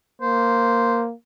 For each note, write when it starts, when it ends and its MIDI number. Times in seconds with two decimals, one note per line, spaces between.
0.22 1.13 58
0.22 1.02 72